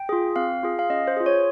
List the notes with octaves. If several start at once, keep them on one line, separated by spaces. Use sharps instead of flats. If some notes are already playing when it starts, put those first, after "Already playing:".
Already playing: G5
F4 G#4
C4 F5
F4 G#4
F5
C#4 D#5
C5
F4 G#4
C#5